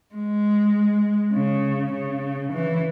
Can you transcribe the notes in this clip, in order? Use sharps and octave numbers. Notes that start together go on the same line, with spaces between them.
G#3
C#3
C#3
E3